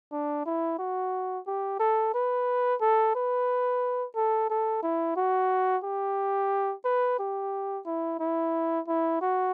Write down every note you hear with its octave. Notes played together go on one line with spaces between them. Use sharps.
D4
E4
F#4
G4
A4
B4
A4
B4
A4
A4
E4
F#4
G4
B4
G4
E4
E4
E4
F#4